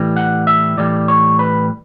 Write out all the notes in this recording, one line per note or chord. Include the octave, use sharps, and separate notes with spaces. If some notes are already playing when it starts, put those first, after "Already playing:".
Already playing: A2 E3 G3
F#5
E5
A2 E3 G3 D5
C#5
B4